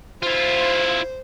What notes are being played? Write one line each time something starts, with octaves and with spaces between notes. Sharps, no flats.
E4 F4 C5